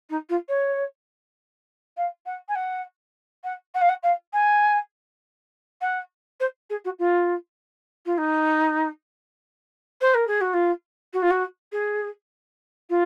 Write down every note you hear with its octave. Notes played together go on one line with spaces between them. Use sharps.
D#4
F4
C#5
F5
F#5
G#5
F#5
F#5
F#5
F5
F#5
F5
G#5
F#5
C5
G#4
F#4
F4
F4
D#4
C5
A#4
G#4
F#4
F4
F#4
F4
F#4
G#4
F4